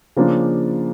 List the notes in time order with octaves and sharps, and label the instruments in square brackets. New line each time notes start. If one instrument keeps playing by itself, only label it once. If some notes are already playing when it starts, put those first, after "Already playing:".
[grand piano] C#3 F3 A#3 D4 F4